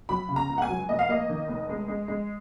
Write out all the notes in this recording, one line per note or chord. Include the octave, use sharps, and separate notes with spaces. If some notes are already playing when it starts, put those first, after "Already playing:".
F#3 B5
C#3
A#5
C#2
F#5
G#5
F#3
F1 D#5
F5
A#3 D#5
D#3
F1
G#3
G#3
G#3